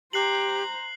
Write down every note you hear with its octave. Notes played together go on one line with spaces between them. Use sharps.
G4 C5 A#5 F#6 C7 F#7